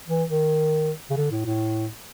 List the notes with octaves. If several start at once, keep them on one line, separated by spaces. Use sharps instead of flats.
E3
D#3
C#3
D3
A2
A2